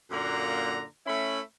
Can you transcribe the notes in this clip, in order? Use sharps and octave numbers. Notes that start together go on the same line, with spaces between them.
F#2 A#2 D3 A#3 F#5 A#5
A3 C#4 E4 B5